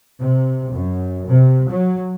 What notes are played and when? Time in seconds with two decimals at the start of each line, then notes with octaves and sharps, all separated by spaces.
0.19 C3
0.73 F#2
1.29 C3
1.69 F#3